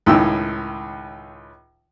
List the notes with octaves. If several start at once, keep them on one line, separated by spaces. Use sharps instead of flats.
C#2 A2 D#3 G5 E6